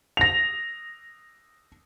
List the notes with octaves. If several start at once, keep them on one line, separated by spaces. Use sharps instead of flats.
A#6 F7